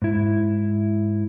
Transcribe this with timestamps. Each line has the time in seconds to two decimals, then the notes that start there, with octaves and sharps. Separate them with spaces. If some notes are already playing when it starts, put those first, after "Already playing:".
0.02 G#2 E4